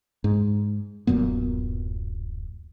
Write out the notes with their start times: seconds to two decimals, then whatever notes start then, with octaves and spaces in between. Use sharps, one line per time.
0.24 G#2
1.07 D1 F#2 A#2 B3